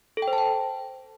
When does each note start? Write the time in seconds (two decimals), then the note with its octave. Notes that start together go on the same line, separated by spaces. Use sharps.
0.17 A4
0.22 G5
0.28 C5
0.33 A5
0.38 G5